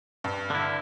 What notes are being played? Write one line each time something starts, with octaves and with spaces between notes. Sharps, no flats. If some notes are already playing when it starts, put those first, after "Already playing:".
G2
D3 E4